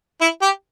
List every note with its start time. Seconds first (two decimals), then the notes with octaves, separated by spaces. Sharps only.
0.21 E4
0.42 G4